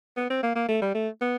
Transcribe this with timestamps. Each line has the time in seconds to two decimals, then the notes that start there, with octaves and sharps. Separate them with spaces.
0.17 B3
0.30 C4
0.43 A#3
0.56 A#3
0.69 A3
0.82 G3
0.95 A3
1.21 B3